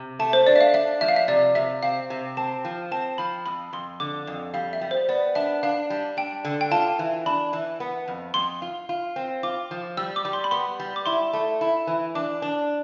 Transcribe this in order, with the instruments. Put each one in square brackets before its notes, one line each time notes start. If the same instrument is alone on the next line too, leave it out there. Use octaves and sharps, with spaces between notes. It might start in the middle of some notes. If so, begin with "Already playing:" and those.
Already playing: [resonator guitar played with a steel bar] C3
[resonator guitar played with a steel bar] A3 [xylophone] A5
[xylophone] C5
[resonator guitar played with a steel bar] D4 [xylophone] D5
[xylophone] E5
F5
[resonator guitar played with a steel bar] D4 [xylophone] E5
[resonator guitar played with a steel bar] F3 [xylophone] E5
[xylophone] F5
E5
[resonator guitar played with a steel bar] C3 [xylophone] D5
[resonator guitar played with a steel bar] C3 [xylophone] E5
[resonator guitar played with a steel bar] C4 [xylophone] F5
[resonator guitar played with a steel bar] C3
[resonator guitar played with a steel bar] C4 [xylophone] A5
[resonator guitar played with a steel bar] F3
[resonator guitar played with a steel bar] C4 [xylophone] A5
[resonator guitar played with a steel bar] F3 [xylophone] B5
[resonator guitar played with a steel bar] F2 [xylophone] B5
[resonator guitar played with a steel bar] F2 [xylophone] C6
[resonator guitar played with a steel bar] D3 [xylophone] D6
[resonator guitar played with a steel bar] F2
[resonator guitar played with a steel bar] G3 [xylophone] F5
[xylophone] E5
[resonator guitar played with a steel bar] G3
[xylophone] C5
[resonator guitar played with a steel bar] B3 [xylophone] D5
[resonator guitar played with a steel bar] D4 [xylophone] E5
[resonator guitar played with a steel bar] D4 [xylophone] F5
[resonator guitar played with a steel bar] G3
[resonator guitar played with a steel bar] D4 [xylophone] G5
[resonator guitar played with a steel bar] D3
[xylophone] G5
[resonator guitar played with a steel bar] F4 [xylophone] A5
[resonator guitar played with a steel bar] E3
[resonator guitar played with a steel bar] D4 [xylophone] B5
[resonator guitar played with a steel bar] E3
B3
F2
[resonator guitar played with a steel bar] F2 [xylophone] C6
[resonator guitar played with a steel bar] F4
F4
C4
[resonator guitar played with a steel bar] F4 [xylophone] D6
[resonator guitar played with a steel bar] F3
[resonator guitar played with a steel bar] G3 [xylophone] E6
[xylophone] D6
[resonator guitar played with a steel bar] G3
[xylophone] C6
B5
[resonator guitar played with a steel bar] B3 [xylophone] C6
[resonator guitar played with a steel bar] G3
[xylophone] D6
[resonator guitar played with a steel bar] E4 [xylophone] C6
[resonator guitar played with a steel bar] A3
E4
E3
[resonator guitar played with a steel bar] D4 [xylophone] D6
[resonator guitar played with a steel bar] D4